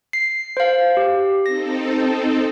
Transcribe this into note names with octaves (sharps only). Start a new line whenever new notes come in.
C7
C5 F5
G4
C4 D#4 A4 A#6